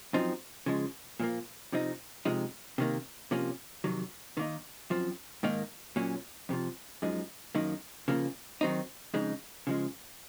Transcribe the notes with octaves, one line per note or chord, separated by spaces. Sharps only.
F#2 F3 C4 D#4
C#3 F3 G#3
A#2 F3 A#3
C3 F3 C4 D#4
C3 F3 G#3 D#4
C3 D#3 A#3
C3 F3 A#3 C#4
F2 C3 D#3 F#3
D#3 A#3 D#4
F#2 F3 C4
G#2 D#3 A#3 D#4
A#2 F#3 C#4
F2 C3 F3
F#2 F3 G#3 D#4
F#2 D#3 A#3 D#4
C#3 F3 A#3
D#3 F#3 C4 D#4
F2 C#3 G#3 D#4
C#3 F3 G#3